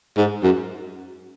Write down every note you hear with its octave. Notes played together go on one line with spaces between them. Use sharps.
G#2
F#2